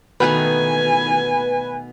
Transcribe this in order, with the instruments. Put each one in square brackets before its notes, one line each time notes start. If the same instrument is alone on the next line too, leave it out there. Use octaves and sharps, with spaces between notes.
[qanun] B2 D#3 A3 [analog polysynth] B4 [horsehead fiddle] G#5